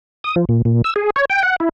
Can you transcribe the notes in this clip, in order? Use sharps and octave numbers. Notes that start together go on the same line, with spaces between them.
D#6
F3
A#2
A#2
E6
G#4
C#5
G5
F#5
E4